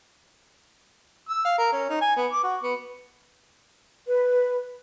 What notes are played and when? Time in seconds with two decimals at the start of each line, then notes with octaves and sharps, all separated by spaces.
1.29 E6
1.45 F5
1.58 A#4
1.72 C#4
1.89 D#4
2.01 G#5
2.17 B3
2.32 D6
2.43 F#4
2.63 B3
4.07 B4